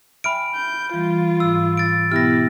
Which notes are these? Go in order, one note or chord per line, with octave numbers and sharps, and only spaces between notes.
E5 G5 G#5 B5 F6 D7
G6
E3 G3 F4
G#2 E3 E6
A6 D7
B2 B3 E4 G4 F6 A#6